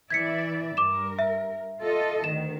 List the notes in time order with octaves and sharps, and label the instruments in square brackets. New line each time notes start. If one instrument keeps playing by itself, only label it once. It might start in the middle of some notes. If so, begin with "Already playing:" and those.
[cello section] E3 D5 E5 [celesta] G#6 B6 C#7
[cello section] G2 A#4 [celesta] D6 E7
[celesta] E5
[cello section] F4 A4 D#5
[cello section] D2 D#3 [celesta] E7